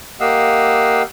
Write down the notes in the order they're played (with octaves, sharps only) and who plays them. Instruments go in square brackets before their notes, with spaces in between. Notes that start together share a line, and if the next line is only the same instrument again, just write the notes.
[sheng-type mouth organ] A#3 G4 D#5 F5 F#5 E6